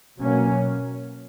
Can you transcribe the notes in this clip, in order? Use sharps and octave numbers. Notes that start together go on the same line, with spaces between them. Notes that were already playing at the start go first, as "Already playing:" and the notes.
B2 F#3 A#3 C#4